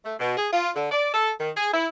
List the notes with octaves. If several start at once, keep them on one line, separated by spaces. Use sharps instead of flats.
A3
B2
G#4
F4
D3
D5
A4
D#3
G#4
E4